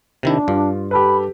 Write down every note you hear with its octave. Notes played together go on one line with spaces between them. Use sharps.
C3 D#3 D4 E4
G2 F4
G4 A4 B4 B5